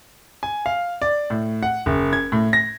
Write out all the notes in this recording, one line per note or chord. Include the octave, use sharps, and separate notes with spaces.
G#5
F5
D5
A2
F#5
F#1
G#6
A2
A#6